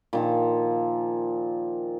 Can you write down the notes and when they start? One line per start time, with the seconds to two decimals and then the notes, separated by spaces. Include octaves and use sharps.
0.13 A#2 D#3 F3